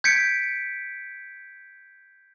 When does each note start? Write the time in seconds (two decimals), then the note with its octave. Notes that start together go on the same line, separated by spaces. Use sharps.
0.04 G6 G#6 B6 C#7 D7